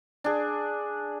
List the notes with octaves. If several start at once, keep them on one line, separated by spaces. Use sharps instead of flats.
D4 G#4